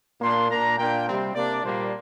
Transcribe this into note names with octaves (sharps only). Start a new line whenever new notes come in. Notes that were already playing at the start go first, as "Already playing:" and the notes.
A#2 A#3 D4 C6
A#2 A#3 D4 A#5
A#2 A#3 D4 G5
C3 G3 C4
C3 A#3 D4 D5
A#2 G3 A#3 D4 C5